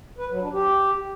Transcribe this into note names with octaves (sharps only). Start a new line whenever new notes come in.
B4
F#3
D4
G4